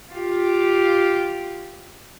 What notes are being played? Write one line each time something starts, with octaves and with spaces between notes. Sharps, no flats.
F4 G4